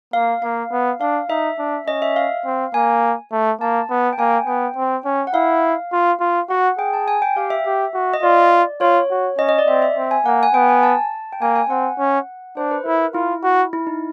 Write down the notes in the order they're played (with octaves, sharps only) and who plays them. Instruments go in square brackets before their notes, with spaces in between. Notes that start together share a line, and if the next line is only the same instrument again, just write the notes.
[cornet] A#3 [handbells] F5
[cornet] A#3 [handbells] F5
[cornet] B3
[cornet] D4 [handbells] F5
[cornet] D#4 [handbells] E5
[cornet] D4
[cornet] C#4 [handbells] D#5
[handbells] E5
F5
[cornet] C4
[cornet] A#3 [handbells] G#5
[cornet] A3
[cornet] A#3 [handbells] A5
[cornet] B3
[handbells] G5
[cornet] A#3 [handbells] G#5
[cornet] B3 [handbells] G5
[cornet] C4
C#4
[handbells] F#5
[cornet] E4 [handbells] F5
[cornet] F4
F4
[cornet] F#4 [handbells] F#5
[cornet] G#4 [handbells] G5
[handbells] A5
G#5
G5
[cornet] G4 [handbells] F5
[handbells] E5
[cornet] G4
F#4
[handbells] D#5
[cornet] F4 [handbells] D5
[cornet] F4 [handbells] C#5
[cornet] F#4
[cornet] C#4 [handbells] D#5
[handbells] D#5
D5
[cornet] C4 [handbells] E5
[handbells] E5
[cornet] C4
[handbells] G#5
[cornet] A#3 [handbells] F#5
[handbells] G#5
[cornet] B3 [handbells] G5
[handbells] G#5
A5
G5
[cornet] A#3 [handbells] G#5
[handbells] G#5
[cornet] C4 [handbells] F#5
[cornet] C#4
[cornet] D4 [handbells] C5
[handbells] B4
[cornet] E4 [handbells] A#4
[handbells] E4 [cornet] F4
[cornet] F#4
[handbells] E4
D#4